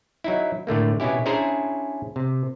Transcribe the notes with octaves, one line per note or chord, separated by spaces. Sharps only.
F#3 D#4 E4
A2 D3 A3 A#3
B2 B3 C#4 E4 G4
C#4 D4 E4 G#4 C5 A#5
C3